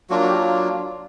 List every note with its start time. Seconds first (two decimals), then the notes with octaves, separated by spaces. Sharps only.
0.10 F#3 A#3 D4 F4 F#4
0.21 F#4
0.28 G4